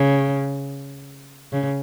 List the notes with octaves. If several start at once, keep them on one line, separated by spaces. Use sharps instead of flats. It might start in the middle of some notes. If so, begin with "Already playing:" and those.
Already playing: C#3
C#3